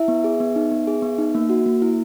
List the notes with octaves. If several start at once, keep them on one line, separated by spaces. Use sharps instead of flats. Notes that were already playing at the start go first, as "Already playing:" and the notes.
Already playing: E4 E5
B3
G#4
B3
D#4
B3
G#4
B3
D#4
A#3
F#4
A#3
E4